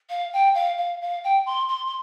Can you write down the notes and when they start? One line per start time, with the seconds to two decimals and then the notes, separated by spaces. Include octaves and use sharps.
0.09 F5
0.33 G5
0.54 F5
0.77 F5
1.01 F5
1.24 G5
1.46 C6
1.68 C6
1.86 C6